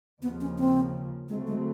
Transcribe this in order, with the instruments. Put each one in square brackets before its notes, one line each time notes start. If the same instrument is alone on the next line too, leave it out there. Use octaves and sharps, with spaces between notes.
[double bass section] D#2 C#3 F3 [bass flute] B3
[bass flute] C#4
C4
[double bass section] D2 C#3 F#3 A3 C4 [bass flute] G#3
[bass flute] G#3